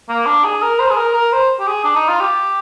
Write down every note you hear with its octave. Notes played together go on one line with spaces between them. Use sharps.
A#3
D4
G#4
A#4
C5
G#4
A#4
A#4
C5
G4
G#4
D4
D#4
F4
G4